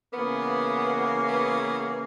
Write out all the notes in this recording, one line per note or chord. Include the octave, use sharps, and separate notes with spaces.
C#3 E3 A#3 B3
B3